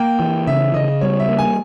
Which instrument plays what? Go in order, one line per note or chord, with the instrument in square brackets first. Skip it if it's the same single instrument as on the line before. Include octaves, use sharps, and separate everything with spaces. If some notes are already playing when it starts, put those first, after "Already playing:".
Already playing: [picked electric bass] A#3 [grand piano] G5
[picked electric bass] E3
[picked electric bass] C#3 [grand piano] E5
[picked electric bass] C#3 [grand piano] D#5
[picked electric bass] G3 [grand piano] C#5
[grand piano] E5
[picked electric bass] A#3
[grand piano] G#5